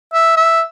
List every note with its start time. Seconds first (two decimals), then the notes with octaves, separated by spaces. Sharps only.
0.13 E5
0.37 E5